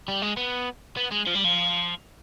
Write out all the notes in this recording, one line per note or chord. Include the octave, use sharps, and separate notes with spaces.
G3
G#3
B3
B3
G#3
F3
G3
F3